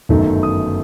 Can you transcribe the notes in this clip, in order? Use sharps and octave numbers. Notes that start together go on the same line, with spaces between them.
G1 F#2 D#3 A3 D#4
D#6